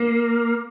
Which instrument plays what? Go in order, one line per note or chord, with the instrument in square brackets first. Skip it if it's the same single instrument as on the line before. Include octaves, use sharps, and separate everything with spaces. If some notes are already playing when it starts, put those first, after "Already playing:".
Already playing: [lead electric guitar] A#3